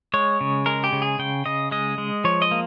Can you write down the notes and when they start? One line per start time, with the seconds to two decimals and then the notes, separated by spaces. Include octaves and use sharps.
0.14 G#3 C#5
0.41 C#3
0.66 G#3 A#4
0.84 G4
0.93 C#3
1.02 G#4
1.19 C#3 G5
1.46 C#3 D#5
1.71 G#3 D#5
1.98 G#3
2.24 F3 C#5
2.42 D#5
2.51 A#3